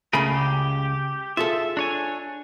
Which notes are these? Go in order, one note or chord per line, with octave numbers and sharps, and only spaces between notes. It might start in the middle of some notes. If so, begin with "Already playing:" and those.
C#2 C#3 A3 G#4 A#4 B5
G4
F4 G#4 A4 E5
D4 C#5 G#5